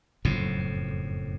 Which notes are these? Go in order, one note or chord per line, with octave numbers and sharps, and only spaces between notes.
F#1 F2 A2